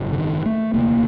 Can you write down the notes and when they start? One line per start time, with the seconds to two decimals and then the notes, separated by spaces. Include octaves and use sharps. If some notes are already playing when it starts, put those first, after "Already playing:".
Already playing: G#1 F#2 C#3
0.13 D3
0.18 D#3
0.46 A3
0.73 E1 D2 C3 A#3